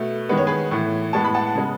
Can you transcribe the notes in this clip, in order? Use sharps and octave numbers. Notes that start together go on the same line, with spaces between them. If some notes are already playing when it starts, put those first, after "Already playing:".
Already playing: B2 A3
D#3 G#3 B3 B4
C#5
G#4 B4
A2 E3 A3
A2 G#3 B3 A5
B5
F#5 A5
C#3 G#3 B3